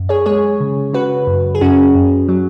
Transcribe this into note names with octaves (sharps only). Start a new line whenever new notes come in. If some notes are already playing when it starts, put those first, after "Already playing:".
Already playing: F#2
G#4 C#5
G#3 G#4 C#5
C#3
C#3 F#4 B4
F#2
G#4
F#2 C#4 F#4
F#2
F#3